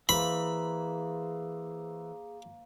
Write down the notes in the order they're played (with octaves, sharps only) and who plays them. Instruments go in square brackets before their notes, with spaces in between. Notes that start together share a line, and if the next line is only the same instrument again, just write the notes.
[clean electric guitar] E3 [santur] A#3 C5 [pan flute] G#4 [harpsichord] B5